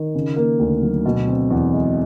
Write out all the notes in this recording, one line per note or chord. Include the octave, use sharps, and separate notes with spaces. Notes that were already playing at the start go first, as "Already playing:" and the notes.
Already playing: D#3
C#3
A#3
D2
F#3
B2
C4
E2
G#3